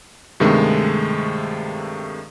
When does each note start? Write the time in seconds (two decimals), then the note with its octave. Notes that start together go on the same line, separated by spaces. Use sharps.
0.40 G2 C3 D#3 G#3 A3